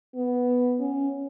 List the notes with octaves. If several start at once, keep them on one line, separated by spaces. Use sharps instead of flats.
B3
C#4